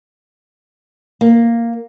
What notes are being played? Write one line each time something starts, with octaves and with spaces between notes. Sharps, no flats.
A#3